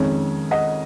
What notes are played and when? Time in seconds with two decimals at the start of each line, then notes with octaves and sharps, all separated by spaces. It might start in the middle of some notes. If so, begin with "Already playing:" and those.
Already playing: F2 D#3 G#3 C#4
0.51 D#5 F#5